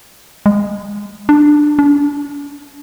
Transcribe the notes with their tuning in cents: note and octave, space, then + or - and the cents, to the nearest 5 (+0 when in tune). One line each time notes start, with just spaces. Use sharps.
G#3 -20
D4 +10
D4 -35